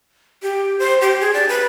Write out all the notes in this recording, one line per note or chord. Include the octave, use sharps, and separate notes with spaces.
G4
C5
G4
G#4
D5
B4